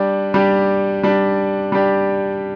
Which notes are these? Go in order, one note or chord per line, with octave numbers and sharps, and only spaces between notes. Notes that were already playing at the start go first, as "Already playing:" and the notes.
Already playing: G3 D4 G4
G3 D4 G4
G3 D4 G4
G3 D4 G4